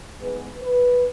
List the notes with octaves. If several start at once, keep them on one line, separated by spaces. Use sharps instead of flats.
G#2 G#3 B3 B4
B4